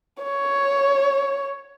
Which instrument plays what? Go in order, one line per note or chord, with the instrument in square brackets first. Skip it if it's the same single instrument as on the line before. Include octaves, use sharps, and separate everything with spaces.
[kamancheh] C#5